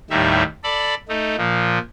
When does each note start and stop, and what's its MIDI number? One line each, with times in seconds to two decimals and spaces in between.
0.10 0.43 39
0.10 0.43 45
0.10 0.43 55
0.10 0.43 63
0.10 0.43 76
0.64 0.95 69
0.64 0.95 74
0.64 0.95 83
1.09 1.36 57
1.09 1.36 63
1.38 1.79 46
1.38 1.79 53